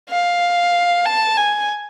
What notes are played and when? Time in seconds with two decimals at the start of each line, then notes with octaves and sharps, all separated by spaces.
0.10 F5
1.05 A5
1.37 G#5